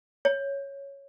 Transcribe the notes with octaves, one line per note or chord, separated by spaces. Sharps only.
C#5